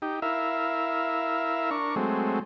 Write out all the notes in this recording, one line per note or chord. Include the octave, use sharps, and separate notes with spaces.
D#4 G4
E4 A#4 E5 F5
D4 A#4 C#6
F#3 G#3 A3 C4